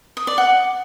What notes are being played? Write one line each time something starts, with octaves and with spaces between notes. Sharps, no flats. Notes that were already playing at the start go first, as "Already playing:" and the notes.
D#6
D5
F#5